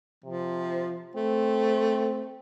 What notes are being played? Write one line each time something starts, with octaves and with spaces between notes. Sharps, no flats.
C3 F3
A3 C4